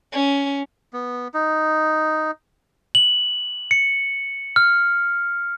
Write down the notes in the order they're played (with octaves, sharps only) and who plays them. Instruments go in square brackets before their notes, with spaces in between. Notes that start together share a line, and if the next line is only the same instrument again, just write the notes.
[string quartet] C#4
[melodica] B3
D#4
[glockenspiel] F#7
C#7
F6